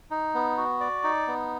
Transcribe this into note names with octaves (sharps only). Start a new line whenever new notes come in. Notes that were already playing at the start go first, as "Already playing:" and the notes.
D#4
B3
F#4
D5
D#4
B3